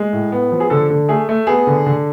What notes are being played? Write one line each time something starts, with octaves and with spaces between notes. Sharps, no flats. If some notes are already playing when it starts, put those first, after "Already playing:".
Already playing: G#3
A2
B3
F3
G#4
D3 A4
D3
A3 G#4
A3
B3 G#4
D3
D3